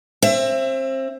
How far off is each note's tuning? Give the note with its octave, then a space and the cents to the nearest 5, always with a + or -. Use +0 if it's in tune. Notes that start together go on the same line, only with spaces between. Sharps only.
C4 +25 E5 +30